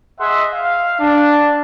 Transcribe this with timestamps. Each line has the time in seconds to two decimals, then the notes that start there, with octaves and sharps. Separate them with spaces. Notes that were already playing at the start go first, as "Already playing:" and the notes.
0.20 G#4 D#5 E5 F#5 G#5 C6
0.54 F5
1.00 D4